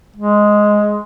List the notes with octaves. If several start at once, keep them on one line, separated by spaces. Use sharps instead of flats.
G#3